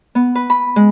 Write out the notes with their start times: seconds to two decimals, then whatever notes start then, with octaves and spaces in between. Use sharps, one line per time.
0.15 B3
0.35 B4
0.50 B5
0.76 G#3